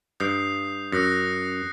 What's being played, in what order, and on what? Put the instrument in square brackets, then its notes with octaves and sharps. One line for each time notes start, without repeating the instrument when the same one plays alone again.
[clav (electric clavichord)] G2 [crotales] D#6 G6 C7
[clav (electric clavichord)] F#2 [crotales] D#6 F#6 A#6 C#7